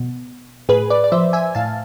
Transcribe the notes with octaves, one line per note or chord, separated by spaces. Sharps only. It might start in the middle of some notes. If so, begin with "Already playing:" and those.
Already playing: B2
A2 G#4 B4
B4 D5
D5
F3 C5 E5
E5 G#5
A2 F5 A5